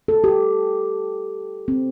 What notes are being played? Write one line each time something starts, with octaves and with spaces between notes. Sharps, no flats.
A4
G4
C4